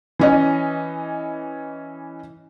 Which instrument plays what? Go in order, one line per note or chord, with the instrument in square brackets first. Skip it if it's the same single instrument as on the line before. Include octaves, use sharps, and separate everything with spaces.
[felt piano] E3 C#4 D#5